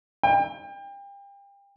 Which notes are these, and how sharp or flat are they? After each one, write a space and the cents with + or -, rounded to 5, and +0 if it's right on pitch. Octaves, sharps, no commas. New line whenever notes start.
G5 +30